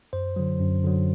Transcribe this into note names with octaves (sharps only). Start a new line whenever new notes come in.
F#2 C5
D3 F#3
F#2
D3 F#3